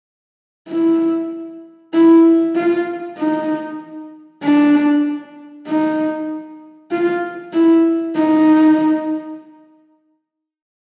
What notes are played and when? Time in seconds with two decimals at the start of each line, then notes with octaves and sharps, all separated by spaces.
0.69 E4
1.94 E4
2.56 F4
3.18 D#4
4.43 D4
5.67 D#4
6.91 F4
7.53 E4
8.15 D#4